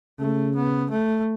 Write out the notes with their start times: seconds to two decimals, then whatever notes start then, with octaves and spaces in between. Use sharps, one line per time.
0.19 C#3 A3
0.55 B3
0.90 A3